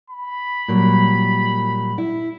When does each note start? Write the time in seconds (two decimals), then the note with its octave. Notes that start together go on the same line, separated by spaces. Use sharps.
0.10 B5
0.68 A#2 F#3 G3
1.98 E4